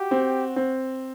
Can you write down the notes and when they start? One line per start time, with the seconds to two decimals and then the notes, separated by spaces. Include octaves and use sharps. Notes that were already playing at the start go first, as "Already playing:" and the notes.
Already playing: F#4 G4
0.11 C4
0.56 C4